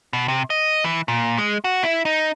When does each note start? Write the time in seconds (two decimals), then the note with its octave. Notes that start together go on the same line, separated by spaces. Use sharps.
0.13 B2
0.28 C3
0.50 D#5
0.84 E3
1.08 A#2
1.38 G#3
1.64 F#4
1.84 E4
2.05 D#4